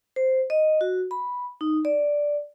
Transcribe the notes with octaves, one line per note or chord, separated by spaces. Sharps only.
C5
D#5
F#4
B5
D#4
D5